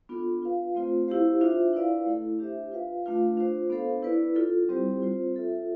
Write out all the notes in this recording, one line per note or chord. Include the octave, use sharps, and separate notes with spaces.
B3 D4 F4 A4
F4 B4 F5
A3 C4 F4 C5
E4 G4 C5 F5
D4 F4 C5 E5
E4 B4 D5 F5
A3 E4 A4
D4 G4 C5 E5
F4 B4 F5
A3 D4 F4 B4 F5
D4 F4 C5
B3 D4 A4 C5 F5
E4 B4 D5
D4 F4 A4
G3 C4 E4 G4 C5
C4 F4 C5
F4 A4 E5